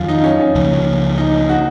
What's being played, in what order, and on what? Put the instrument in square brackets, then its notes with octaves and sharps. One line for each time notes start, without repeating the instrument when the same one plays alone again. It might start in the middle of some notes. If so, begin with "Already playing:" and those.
Already playing: [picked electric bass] F2 D#3 F#3 [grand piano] F4
[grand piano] D#4
C#4
C#4
[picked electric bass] C#2 C#3 F3 A#3
[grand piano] D#4
F#4